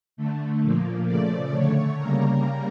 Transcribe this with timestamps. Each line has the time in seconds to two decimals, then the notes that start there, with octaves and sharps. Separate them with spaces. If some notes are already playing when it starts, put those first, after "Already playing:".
0.17 D3 A3
0.62 A#2 F3 A#3
1.07 C#3 F3 A3 D5
1.53 D3 A3 C#5
1.98 C#3 G3 A#3 A#4